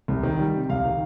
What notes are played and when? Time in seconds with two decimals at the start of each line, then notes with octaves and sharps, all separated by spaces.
0.08 C2
0.23 D#3
0.39 G3
0.54 C3
0.69 C2 F5
0.85 D#3